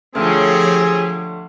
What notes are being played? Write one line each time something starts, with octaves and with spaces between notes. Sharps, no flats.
D2 F3 A3 C4 G4 G#4 C#5 F6